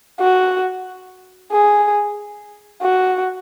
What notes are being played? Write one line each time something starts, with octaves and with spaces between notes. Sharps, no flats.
F#4
G#4
F#4